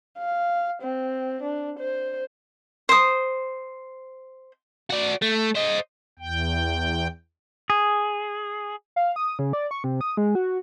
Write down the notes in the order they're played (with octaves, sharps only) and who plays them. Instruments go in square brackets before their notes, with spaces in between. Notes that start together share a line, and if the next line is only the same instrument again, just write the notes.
[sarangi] F5
C4
D4
C5
[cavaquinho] C5 D#6
[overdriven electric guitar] F#4 D5
A3
C5 D#5
[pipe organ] E2 G5
[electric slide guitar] G#4
[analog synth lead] F5
D#6
C#3
D5
C#6
C3
D#6
G#3
F#4